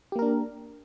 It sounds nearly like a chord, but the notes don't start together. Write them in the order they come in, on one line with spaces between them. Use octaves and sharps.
G4 A#3 A#4 D4